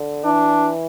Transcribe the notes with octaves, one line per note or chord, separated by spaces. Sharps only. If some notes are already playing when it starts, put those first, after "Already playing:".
Already playing: D3
E3 D4